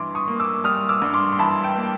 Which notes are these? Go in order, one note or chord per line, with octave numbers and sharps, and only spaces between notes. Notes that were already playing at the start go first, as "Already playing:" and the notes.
Already playing: G2 E3 C6 D6
C#6 D#6
A#3
D6 E6
G3 D#6 F6
D6 E6
G2
C6 D6
C6
E3 A5 B5
G5 A5
A#3